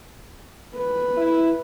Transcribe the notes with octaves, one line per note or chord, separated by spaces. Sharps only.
B4
E4